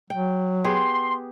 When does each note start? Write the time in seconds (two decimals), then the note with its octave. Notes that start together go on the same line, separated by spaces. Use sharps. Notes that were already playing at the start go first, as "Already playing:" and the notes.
0.10 F#3 G5
0.64 B3 G4 G#4 C6